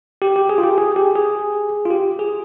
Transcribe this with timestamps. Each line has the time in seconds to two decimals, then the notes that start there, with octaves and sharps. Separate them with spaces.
0.22 G4
0.36 G4
0.49 G#4
0.58 F4
0.63 G4
0.78 G#4
0.96 G4
1.15 G#4
1.85 F4
1.91 G4
2.19 G#4